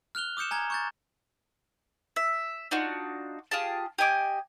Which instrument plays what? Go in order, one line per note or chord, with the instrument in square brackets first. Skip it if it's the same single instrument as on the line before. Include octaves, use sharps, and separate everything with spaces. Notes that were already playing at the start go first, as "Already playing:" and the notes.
[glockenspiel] F6 F#6 F7 G7
D6 D#6 G6 C#7 E7
G#5 A#5 G#6
C#6 G6 A6
[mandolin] E5
D4 D#4 F4 F#4
F4 G4 G#4 A5
G4 D#5 G#5 D6